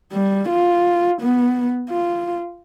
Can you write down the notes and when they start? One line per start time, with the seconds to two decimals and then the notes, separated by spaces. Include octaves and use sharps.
0.13 G3
0.49 F4
1.22 B3
1.90 F4